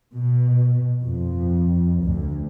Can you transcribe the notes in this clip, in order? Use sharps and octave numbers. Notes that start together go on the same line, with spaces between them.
B2
F2
D2